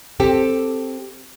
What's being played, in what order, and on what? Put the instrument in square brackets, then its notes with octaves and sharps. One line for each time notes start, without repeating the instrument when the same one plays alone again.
[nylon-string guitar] C4 G4 A4